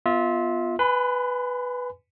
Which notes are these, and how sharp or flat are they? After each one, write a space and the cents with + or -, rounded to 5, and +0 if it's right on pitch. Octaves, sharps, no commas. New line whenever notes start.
B3 +0 F4 +0 E5 -30
B4 +0 G#5 +0 B5 +45